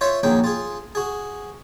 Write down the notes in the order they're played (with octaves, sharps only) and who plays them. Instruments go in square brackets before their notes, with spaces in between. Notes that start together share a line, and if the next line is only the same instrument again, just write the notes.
[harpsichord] F4 C5 C#5 E5
A#1 D#2 F#3 G#4 G5
F4 G#4
F#4 G#4